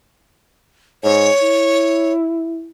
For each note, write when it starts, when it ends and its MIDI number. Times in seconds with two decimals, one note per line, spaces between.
1.03 1.30 44
1.03 2.12 73
1.42 2.70 64